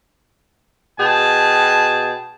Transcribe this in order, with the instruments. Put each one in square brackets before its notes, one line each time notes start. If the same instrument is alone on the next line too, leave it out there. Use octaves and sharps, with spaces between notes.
[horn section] B2 G#4 G5 A5